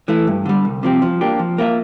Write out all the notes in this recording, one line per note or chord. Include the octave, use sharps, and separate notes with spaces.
E3 A3 E4
G2
D3 G3
C2
C3 F3 C4 G4
F3
A#3 D4 G4
F3
A#3 F4 A#4 E5